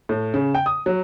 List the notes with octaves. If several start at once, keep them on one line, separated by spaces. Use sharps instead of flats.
A2
C#3
G5
D#6
F#3